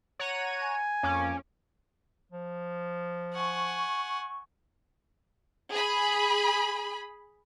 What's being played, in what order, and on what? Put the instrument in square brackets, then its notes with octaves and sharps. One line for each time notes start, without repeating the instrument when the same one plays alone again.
[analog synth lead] C#5 [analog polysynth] F#5 A#5 D#7
[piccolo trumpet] G#5
[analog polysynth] F2 A#3 D6 [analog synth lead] C#4
[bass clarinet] F3
[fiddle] F#5 G#5 [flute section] C#6
[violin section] G#4 B5